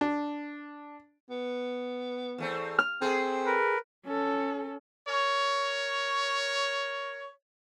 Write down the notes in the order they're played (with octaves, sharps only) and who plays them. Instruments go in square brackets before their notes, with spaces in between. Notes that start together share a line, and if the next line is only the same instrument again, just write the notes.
[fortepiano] D4
[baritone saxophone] B3
[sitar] E2 A3 C4
[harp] F6
[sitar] A3 G#4 [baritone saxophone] C4
[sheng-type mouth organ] A#4 B4
[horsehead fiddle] C#4 A4
[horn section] A#4 C#5